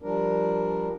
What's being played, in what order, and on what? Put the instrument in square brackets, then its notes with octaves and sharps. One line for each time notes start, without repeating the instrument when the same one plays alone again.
[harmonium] F3 G3 D4 A#4